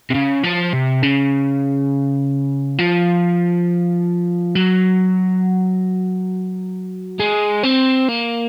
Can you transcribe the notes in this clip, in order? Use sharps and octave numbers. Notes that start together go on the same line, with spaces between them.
C3
C#3
F3
C3
C#3
F3
F#3
G#3
C4
A#3